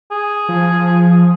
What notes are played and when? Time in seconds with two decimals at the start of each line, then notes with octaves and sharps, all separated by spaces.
0.11 G#4
0.49 F3